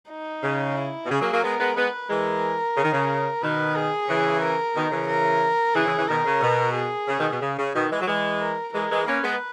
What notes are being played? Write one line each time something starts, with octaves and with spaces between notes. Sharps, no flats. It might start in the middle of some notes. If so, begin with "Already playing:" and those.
D#4
C#3
E4
B2
C#3 G#4
F#3 A#3
F#3 A#3
G#3 B3 A#4
G#3 B3
G#3 B3 B4
E3 G#3 A#4
C#3
D#3
C#3
B2 D#3 B4
G#4
C#3 E3
A#4
B2 D#3
C#3 E3
A#4
C#3 E3 G#4
C#3 E3
C#3 E3
B2 D#3 A#4
C#3
B2
G#4
C#3
B2 D#3
B2
C#3
C#3
B2 D#3
E3 G#3
F#3
E3 G#3
A#4
E3 G#3 A#4
E3 G#3
A#3 C#4 B4
G#3 B3